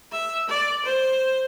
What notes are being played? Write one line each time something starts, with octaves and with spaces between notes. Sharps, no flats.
E5
D5
C5